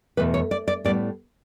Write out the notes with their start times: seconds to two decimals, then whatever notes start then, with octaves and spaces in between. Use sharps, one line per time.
0.17 E2 B2 A3 B4
0.34 C#5
0.51 D5
0.68 D5
0.85 A2 G3 B3 D5